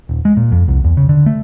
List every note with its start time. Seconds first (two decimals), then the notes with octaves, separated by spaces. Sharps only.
0.09 D#1
0.25 G#3
0.37 A#2
0.52 F2
0.68 C2
0.84 E2
0.97 C#3
1.09 D3
1.26 A3